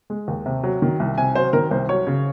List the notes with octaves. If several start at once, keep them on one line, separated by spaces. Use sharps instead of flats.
G#3
D#2
C3
F#3
D#3
C2
C3 G#5
F#3 C5
D#3 A#4
C2 C5
F#3 C#5
C#3